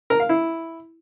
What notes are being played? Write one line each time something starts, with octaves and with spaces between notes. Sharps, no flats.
A#4
F5
E4